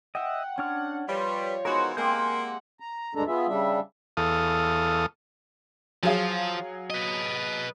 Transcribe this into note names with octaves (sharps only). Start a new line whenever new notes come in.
D#5 E5 F#5 G5
C#4 D4 C#5 F6
F3 G3 B4 C#5
E3 G#3 B3 D#4 F#4 A#4 C5
G#3 A#3 C4 G4 F#5 G#5 G6
A#5
D2 G2 G#3 D4 A4 A#5
B3 F4 G#4 E5
C#3 G3 D4 E5
E2 A4 F5 D#6
F3 F#3 G#4 F5
B4 D#5